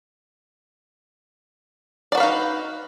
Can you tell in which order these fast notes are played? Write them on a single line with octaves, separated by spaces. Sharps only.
D5 F#4 B4 F5 D#4